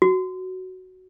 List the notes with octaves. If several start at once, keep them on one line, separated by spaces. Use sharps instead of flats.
F#4